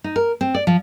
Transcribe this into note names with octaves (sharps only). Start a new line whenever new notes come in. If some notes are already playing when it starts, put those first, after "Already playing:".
D#4
A#4
C4
D5
F3